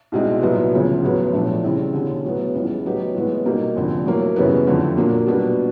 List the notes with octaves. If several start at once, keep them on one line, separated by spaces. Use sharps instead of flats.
C2 B2 G#3 C4 D#4
C2 A#2 F#3 B3
E1 D2 C#3 F3
A1 A2 F#3 B3
A#1 A2 F3 A3 D4
C#3 E3 G3 C4 E4
E1 D#2 D3
A2 F#3 B3
C#2 C#3 E3 G3
A2 F#3 B3 D#4 G4
A2 E3 G#3 B3
B2 G3 A#3 D#4
F1 F2 D3
A2 F#3 A#3
F#2 C#3 E3 G3 B3
F2 D3 F3 A3
A#2 F#3 A#3 D4
B2 G3 B3 D4